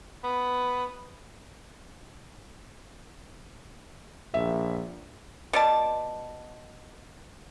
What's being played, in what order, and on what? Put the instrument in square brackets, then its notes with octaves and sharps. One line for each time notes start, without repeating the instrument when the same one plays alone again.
[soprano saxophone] B3
[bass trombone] A#1 [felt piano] E5
[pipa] B2 D5 A5